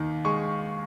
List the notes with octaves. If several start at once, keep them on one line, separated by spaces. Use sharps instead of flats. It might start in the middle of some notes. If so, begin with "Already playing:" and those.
Already playing: D#2 D#3
G#3 C#6